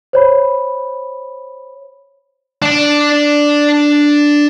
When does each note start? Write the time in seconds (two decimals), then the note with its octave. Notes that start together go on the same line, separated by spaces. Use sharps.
0.13 C5 C#5 B5
2.62 D4 D5